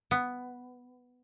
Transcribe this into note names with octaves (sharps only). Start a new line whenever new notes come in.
B3